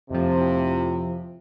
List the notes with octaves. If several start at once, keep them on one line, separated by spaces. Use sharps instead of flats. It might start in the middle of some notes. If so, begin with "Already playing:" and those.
F2 A2 C3 F3